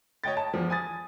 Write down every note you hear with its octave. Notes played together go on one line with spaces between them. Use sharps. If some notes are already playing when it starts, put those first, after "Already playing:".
C#5 D#5 G5 A6
A5
E2 F3
G#5 D#6 A6